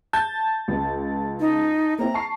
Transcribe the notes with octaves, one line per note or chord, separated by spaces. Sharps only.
A5 G6 A6
C#2
D#4
A#3 C4 E4 A#5
A5 C#6 C7